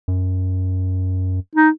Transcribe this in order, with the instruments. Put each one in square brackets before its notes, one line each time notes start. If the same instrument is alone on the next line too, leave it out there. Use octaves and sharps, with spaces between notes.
[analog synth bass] F#2
[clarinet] D#4